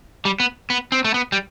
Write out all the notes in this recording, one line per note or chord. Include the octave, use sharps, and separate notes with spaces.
G3
B3
B3
C4
A3
B3
G3